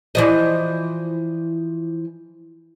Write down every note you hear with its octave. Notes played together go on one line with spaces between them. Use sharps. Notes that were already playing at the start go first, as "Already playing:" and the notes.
E3 F3 D#5